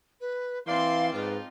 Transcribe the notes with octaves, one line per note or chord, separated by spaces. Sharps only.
B4
E3 A#3 C4 D5 F5 C6
G#2 F3 D#4 F4 B4